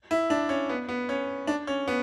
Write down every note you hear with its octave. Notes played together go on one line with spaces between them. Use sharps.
E4
D4
C#4
B3
B3
C#4
D4
C#4
B3